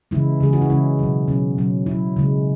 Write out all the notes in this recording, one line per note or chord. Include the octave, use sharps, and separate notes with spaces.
C#3 E3 G#3 E4
C#3 E3 G#3 G#4
F#4
E4
C#3 E3 G#3 C#4
B2 F#3
B2 F#3 C#4
B2 F#3
B2 F#3 E4
C#3 G#3